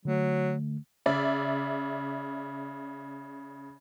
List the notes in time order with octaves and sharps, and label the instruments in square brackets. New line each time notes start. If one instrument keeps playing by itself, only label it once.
[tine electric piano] D3 A3 [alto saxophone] F#3
[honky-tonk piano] C#3 D5 E5